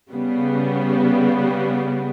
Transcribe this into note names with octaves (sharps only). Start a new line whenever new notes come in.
C#3 G3 B3